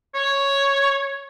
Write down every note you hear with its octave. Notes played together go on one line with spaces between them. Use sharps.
C#5